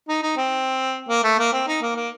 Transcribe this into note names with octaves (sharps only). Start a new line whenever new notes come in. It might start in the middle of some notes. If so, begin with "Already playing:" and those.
D#4
D#4
C4
A#3
A3
A#3
C4
D#4
A#3
A#3